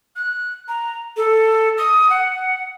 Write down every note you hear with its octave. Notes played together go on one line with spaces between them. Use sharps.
F#6
A#5
A4
D#6
F#5